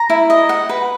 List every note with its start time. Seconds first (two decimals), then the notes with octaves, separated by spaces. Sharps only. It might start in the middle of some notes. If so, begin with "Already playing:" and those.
Already playing: A#5
0.10 E4
0.30 D#5
0.49 F#5
0.69 B4